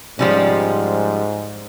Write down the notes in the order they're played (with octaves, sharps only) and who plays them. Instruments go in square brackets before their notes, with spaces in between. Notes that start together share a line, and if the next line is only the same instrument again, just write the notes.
[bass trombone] G#2 [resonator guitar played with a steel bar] F3 G3 C#4